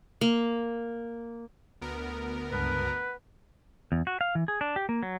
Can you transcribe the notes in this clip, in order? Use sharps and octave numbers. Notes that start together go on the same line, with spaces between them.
A#3
D2 B3 A#4
C#2 G2 B4 A5
F#5
E2
F#4
F5
E3
G#4
D4
G4
A#3
F#3